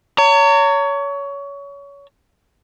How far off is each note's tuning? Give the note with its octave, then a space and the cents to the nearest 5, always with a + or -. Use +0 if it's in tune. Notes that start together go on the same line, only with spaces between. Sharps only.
C#5 +25 A#5 -35